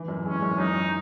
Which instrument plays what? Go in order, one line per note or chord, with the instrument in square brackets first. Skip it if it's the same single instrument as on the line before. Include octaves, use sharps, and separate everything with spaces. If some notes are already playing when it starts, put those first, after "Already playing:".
Already playing: [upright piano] E3
F#2
[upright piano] G#3 [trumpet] C#4
[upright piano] F#2
[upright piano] F#2 [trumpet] D#4